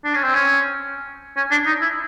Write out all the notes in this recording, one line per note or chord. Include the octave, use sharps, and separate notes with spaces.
D4
C#4
C4
C#4
C#4
D4
D#4
E4